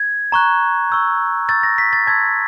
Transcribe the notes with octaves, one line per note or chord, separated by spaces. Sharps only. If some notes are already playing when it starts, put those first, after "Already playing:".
Already playing: G#6
A#5 C#6 F#6
C#6 E6 G6
C#6 E6 G6 A6
A#6
B6
A6
A5 C6 E6 G6 G#6